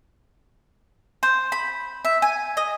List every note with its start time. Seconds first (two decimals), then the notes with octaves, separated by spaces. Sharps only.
1.23 C5
1.52 B5
2.05 E5
2.22 G#5
2.57 D#5